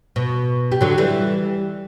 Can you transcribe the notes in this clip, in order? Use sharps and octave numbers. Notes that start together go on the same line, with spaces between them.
B2
G3
D3 F#3
E3 G3